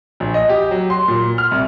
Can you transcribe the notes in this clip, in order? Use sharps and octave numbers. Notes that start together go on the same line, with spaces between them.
A#1
D#5
G4
F#3
C6
A#2
F6
C2